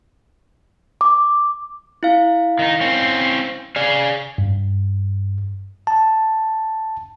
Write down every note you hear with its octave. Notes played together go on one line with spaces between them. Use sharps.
D6
E4 F5
D#3 D#4
C4 C#4
G#4 D5 F5
G2
A5